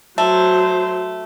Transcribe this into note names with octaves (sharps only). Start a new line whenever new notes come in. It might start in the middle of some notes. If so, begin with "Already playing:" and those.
F#3 A3 C5